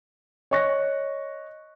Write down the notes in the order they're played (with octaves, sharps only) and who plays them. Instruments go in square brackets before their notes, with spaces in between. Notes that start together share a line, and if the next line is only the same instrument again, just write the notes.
[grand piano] C#5 D#5 C#6 F#6 A#6